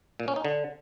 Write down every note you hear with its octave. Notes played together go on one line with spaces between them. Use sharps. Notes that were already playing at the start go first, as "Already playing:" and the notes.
A#2
C#4
D#4
D3